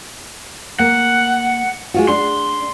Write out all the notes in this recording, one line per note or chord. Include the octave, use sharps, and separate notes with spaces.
A#3 F#5
G#3 F4 F#4
D4 C6